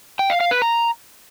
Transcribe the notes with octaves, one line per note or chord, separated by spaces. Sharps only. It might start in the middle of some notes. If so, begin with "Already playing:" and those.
G5
F5
F5
B4
A#5